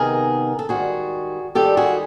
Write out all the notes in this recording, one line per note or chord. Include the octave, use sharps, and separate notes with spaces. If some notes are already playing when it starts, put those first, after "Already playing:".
Already playing: C3 D#3 B3 D#4 G#4 A#4
A4
G#2 D#3 G3 F#4 G#4
G#2 D#3 G3 G4 A4
F#4 G#4